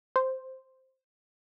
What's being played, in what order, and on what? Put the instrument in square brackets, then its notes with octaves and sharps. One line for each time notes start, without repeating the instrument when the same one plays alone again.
[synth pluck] C5